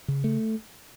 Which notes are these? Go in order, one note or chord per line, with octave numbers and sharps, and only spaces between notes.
C#3
A3